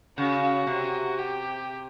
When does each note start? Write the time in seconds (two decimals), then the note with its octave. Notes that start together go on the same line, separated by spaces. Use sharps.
0.17 C#3 F#4
0.67 C3
1.18 G4